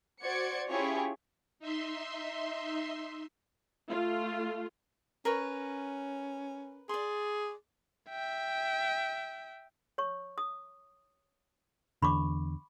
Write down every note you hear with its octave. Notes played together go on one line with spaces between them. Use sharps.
F#4 C5 D5 G#6 C#7
C#4 E4 F4 G4 G#4 C#5
D#4 E5 C6
A3 F4
C#4 A#4 B4 C#5
G#4 D5 C6
E5 G5
C#5 C#6
D#6
E2 D3 B5 C#6 D6